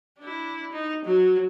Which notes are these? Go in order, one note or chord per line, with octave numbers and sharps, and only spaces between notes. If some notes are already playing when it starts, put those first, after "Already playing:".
D4 E4
D#4
F#3